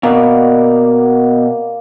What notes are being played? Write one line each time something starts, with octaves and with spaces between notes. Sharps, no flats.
B2 A#3 D5